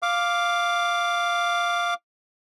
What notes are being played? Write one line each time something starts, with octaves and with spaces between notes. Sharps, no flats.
F5 D6